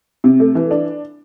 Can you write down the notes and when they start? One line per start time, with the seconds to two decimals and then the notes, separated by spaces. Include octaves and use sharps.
0.24 C3
0.40 A3
0.55 E3
0.71 D4